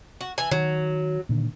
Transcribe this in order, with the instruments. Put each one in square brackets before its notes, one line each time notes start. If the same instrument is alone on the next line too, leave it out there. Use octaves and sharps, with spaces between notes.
[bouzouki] F#4
E3 G#5
[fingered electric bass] D#3 [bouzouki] F#3
[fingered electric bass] A#2 D3 D#3